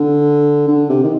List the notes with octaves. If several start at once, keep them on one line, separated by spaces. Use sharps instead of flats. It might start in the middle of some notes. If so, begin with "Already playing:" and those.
Already playing: D3
D3
C3
D#3